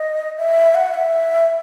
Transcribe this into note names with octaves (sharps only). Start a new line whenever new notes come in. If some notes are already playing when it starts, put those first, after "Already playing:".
Already playing: D#5
E5
F#5
E5